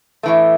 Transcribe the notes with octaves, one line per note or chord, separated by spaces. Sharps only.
A2 E3 A3